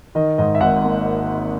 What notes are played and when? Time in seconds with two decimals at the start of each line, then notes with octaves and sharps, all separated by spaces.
0.15 D#3 D#5
0.38 G#2 D#5
0.55 E5
0.61 G#1 F#5
0.84 A#3